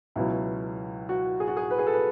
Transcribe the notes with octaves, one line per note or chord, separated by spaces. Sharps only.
C#2 B2 F#3 E4
F#4
G#4
F#4
G#4
B4
G#4
A4
B4